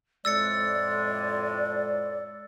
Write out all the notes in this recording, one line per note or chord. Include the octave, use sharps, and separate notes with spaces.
F2 A2 G#3 D5 E6 A6 C#7